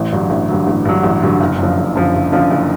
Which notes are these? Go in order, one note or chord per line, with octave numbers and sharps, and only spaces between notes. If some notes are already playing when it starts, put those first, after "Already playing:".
Already playing: A1
G2 D3 F#3
A1
G2 D3 F#3
A1
G2 D3 F#3
A1
G2 D3 F#3
F#1
F#2 D3 F3
F#1
F#2 D3 F3
F#1
F#2 D3 F3
F#1